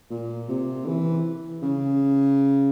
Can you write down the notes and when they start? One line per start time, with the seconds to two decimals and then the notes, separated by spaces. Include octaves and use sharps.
0.10 A#2
0.49 C3
0.86 E3
1.62 C#3